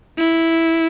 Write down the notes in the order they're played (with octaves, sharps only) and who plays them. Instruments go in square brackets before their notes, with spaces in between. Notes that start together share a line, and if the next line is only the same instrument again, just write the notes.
[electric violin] E4